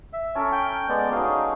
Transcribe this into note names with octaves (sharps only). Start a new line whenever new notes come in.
E5
C#4 A4 A#4
G5
G#3 B3 D5
F#3 D#4 G#4 F5